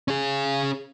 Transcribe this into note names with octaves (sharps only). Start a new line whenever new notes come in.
C#4 G#4